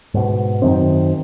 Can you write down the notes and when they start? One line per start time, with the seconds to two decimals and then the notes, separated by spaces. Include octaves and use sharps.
0.14 G#2 B2
0.62 F#2 D#3 C4